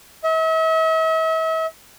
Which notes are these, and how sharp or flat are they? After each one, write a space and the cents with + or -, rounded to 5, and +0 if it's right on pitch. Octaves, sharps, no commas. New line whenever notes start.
E5 -45